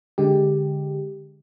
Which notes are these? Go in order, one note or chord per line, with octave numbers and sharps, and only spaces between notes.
D3 G#3 G4